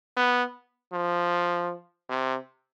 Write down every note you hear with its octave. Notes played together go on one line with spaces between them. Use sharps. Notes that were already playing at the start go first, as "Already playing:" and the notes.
B3
F3
C3